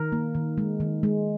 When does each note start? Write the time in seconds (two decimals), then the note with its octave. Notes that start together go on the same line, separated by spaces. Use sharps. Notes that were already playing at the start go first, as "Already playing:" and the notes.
Already playing: D#3 A#4
0.12 A#3
0.35 D#3
0.58 G#3
0.80 D#3
1.03 G#3